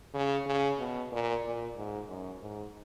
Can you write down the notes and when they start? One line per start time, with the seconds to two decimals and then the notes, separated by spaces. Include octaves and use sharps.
0.14 C#3
0.47 C#3
0.79 B2
1.12 A#2
1.44 A#2
1.77 G#2
2.09 F#2
2.42 G#2